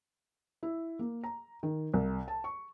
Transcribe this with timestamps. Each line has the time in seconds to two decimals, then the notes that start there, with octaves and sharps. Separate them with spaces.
0.63 E4
0.99 A#3
1.24 A#5
1.63 D#3
1.94 C2
2.28 A5
2.44 C#6